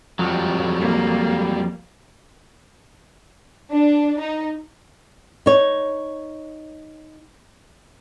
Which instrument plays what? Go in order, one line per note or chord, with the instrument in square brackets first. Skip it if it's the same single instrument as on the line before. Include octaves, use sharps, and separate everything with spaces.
[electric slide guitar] F2 [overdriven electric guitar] F#3 G3
[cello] A#3
[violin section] D4
D#4
[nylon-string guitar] D#4 C#5